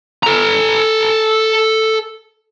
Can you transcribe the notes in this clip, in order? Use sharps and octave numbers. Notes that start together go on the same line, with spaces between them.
A4 A#5